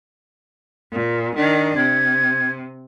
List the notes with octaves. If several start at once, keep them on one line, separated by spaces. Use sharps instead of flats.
A#2
D#3 D4
C3 G#6